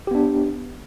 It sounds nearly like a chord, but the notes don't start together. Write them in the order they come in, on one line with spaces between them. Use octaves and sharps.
G4 B3 D4